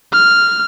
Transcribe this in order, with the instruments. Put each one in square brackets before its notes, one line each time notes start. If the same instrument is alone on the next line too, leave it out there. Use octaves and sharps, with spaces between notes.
[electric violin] F6